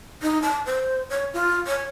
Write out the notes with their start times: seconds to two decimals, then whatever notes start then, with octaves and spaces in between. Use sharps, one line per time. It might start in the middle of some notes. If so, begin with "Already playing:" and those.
0.22 D#4
0.42 A5
0.66 C5
1.10 C#5
1.34 F4
1.67 C#5